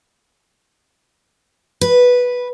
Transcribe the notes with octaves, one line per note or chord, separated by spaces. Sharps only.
B4